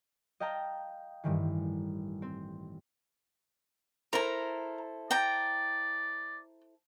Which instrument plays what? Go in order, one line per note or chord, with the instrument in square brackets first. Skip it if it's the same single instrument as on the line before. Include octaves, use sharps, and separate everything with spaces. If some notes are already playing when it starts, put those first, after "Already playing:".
[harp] D#5 F5 G5 A5 A#5
A1 G2 D#3 E3
C4
[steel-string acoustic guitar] E4 A4 C5 [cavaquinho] A#4 A#5
[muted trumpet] D5 [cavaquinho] G5 A#5